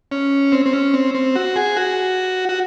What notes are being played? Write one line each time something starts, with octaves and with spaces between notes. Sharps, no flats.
C#4
C4
C4
C#4
C4
C4
F#4
G#4
F#4
F#4